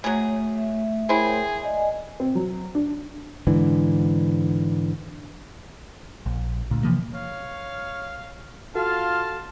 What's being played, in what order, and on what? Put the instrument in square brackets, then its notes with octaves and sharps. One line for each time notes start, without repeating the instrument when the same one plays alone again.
[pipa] F#3 G#4 [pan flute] A3 [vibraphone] C#5
[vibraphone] E5
[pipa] E4 C5 [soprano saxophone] G#4 [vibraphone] A#4 C#5 G5
[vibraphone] D5 D#5 G#5
[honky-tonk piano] C4
F#3
D4
[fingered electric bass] G#2 D3 E3
[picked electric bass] A#1
D2 A#2
C3 E3 F3 A#3
[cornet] C#5 [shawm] F5
[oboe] F4 [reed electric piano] F#4 A4 [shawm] F5 [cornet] A5